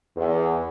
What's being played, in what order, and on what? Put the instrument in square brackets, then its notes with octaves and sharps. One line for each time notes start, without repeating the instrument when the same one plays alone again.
[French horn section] E2